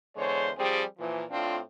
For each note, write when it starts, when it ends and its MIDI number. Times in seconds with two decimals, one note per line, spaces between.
0.17 0.50 40
0.17 0.50 50
0.17 0.50 56
0.17 0.50 72
0.17 0.50 73
0.58 0.83 53
0.58 0.83 55
0.58 0.83 60
0.58 0.83 67
0.58 0.83 68
0.99 1.23 46
0.99 1.23 52
0.99 1.23 53
1.31 1.59 45
1.31 1.59 60
1.31 1.59 62
1.31 1.59 65